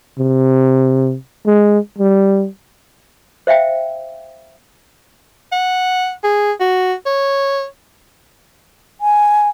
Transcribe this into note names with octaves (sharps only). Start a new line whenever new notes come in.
C3
G#3
G3
C5 E5 F5 G5
F#5
G#4
F#4
C#5
G#5